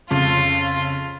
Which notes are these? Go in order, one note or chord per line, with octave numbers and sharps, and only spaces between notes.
F2 C#3 F4